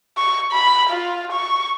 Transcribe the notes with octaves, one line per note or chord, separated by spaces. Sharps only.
C#6
B5
F4
C#6